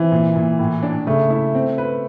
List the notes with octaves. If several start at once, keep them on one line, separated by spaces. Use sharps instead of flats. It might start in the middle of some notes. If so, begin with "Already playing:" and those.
Already playing: E3 C4
A#2
A#2
A2
D4
C#3 A3
E4
C4
B4